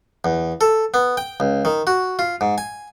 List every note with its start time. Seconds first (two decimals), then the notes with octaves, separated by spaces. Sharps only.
0.25 E2
0.61 A4
0.94 B3
1.17 G5
1.40 C#2
1.65 D#3
1.87 F#4
2.19 F4
2.41 G#2
2.58 G#5